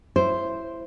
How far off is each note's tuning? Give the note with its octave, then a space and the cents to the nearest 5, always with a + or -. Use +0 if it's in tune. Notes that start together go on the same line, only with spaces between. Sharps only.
E4 +15 C5 +0